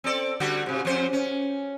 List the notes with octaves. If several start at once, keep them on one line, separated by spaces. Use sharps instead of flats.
C4 A4 D5
D3 G3 F#4
G#2 C3
F2 C#4 C5
C#4